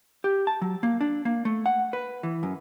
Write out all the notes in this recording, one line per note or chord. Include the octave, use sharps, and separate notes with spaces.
G4
A5
F#3
A#3
D4
A#3
A3
F#5
B4
E3
F#2